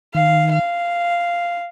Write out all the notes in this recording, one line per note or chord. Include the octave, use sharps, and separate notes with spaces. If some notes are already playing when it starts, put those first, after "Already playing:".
D#3 F5
F5